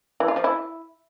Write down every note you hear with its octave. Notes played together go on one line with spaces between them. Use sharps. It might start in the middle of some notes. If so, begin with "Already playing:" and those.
E3
F4
F3
E4